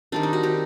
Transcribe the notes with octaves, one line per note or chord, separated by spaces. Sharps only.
D#3 G3 C4 D4
D#4
F#4
G4